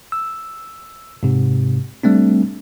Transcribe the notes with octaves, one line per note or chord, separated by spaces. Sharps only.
E6
G#2 C3
G3 A3 C4 D4